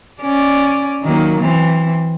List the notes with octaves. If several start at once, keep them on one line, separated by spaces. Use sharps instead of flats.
C#4 D5
D#3 F#3 A#3
E3 C4